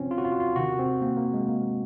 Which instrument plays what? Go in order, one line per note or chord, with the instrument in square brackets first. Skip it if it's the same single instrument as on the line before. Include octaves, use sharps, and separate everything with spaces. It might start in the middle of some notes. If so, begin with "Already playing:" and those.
Already playing: [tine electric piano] C3 F3 C4 C#4 F4
F4
F#4
F4
F#4
F4
C3 D#3 F#4
C4
A#3
A#3
G#3
A#3